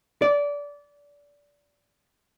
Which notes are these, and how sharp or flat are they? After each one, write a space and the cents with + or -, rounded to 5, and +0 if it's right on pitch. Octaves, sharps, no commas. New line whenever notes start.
D5 -20